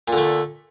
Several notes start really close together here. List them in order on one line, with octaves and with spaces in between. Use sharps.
A#2 D3 A3